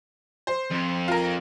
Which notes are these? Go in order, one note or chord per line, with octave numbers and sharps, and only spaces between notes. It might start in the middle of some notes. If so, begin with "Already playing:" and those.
C5
F2
F4 A#4